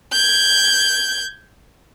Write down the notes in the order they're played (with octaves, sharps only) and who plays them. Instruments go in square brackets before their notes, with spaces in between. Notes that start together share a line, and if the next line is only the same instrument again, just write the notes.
[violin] G6 G#6